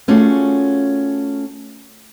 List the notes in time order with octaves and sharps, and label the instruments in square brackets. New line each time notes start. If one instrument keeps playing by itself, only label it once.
[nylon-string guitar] A3 C#4 F4 F#4 G#4 D5